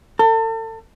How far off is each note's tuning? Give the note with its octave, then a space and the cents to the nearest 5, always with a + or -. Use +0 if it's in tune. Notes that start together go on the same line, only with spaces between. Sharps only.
A4 +35